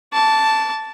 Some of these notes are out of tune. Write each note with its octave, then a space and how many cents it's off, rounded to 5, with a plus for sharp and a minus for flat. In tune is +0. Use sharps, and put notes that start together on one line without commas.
A5 +0 D6 -30